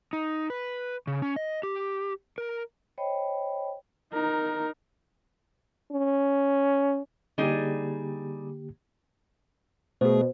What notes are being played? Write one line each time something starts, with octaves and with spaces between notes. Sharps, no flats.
D#4
B4
C#3
C#4
D#5
G4
A#4
C5 C#5 D#5 G5 B5
D#4 A#4
C#4
D3 G3 A#3 D#4 G4 G#4
B2 A3 G#4 C5